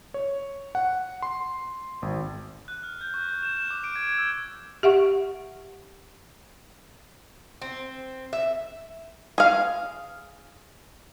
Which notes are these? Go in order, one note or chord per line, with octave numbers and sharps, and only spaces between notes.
C#5
F#5
C6
G#1
F#6
F6
G6
C#6
G6
E7
E7
D6
D7
G#6
E6
G4 E5 F#5 C#6
C4
E5
G#4 F5